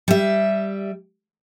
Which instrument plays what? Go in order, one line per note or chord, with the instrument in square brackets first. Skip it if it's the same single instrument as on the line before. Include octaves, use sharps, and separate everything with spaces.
[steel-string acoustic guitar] G3 E5